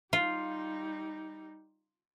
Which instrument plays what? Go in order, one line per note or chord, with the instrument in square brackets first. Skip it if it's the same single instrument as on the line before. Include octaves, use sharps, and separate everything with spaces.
[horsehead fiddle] G3 D#4 [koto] F4